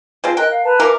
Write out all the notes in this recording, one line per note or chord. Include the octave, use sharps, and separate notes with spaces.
F3 G#3 C4
A#4 D#5 G5 F#6
F5
B4 A5 A#5
E3 A#3 A#4 D6